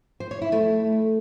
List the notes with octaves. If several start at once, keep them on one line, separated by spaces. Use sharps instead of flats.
C5
C#5
E4
A3